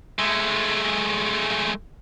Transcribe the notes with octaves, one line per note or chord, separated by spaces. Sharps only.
G#3 A3